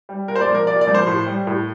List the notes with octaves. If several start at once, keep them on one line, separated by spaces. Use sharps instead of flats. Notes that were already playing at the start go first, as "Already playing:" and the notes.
G3
A#2 A#4
C5
D5
F3
A#4
A#2 D5
D5
F3
C5
A2
G3
A2